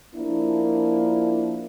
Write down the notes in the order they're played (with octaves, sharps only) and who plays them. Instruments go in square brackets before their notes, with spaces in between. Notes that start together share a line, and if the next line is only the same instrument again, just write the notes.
[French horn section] F3 A#3 D4 E4